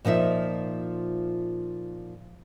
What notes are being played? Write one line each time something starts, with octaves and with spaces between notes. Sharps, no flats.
A#2 F3 D#4 E5